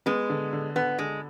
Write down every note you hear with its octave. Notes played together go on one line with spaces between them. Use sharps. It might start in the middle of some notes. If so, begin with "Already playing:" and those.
G#3 B3
D3
D3
D3 B3
D3 G#3